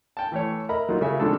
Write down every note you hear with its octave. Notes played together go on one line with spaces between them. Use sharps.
G5 A5
E3 A3 C#5
A#4 D#5 E5 A#5 B5
F#3 A#3 D#4 F4
C#3 G3 A#4 E5 G#5
C3 D#3 F3 G#3 D4 A4